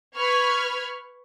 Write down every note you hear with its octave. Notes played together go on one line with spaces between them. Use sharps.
B4 B5 C#6 F6 G#6